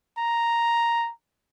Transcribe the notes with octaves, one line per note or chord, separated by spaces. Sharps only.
A#5